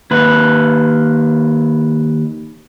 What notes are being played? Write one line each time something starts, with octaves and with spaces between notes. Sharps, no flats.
D#2 B4